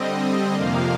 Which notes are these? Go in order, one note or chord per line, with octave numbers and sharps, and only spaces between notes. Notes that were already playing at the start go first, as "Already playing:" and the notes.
Already playing: D3 G3 C4 D#5
F2 C3 F3 A#3 F5